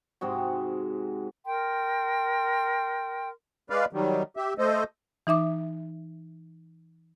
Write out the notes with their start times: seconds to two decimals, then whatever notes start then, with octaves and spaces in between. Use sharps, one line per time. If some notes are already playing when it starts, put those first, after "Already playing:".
0.21 G#2 C3 G#3 F#4
1.46 A#4 G5 C6
3.70 G#3 B4 D5 F5
3.93 D#3 F#3 G3
4.37 G4 E5
4.58 A3 A4 C5 D#5
5.27 E3 D#4 E5 D6